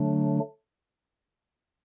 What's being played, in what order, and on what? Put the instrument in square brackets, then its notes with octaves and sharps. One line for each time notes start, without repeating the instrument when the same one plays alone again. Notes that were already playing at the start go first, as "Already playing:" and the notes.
Already playing: [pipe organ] D3 F#3 A3 D4